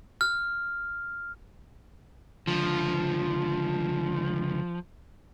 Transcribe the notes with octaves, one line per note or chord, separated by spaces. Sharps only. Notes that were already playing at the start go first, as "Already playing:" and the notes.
F6
C#2 D3 F3